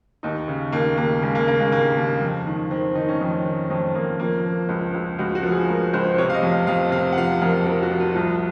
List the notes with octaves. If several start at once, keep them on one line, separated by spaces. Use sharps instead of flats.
D#2 D#4
C#3
D#2 A#3
D#2 A#3
C#3 G#3
A#3
C#3 A#3
G#3
D#2 A#3
D#2
F2
D#3
D#3 C4
D#3 D#4
C#4
F2 C4
D#3
F2 C4
F2 A#3
F3 A#3
F3
C#2
C#2
C#2 F#4
F#4
F3
G#4
C#2 A#4
C#2 C5
C3 C#5
F5
D#5
F2
F5
F2 F5
C3 F5
F#5
F3 F5
F2 A#4
F3 A#4
F#4
F3
F4
C2 F4